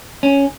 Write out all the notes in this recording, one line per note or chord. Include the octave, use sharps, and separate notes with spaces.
C#4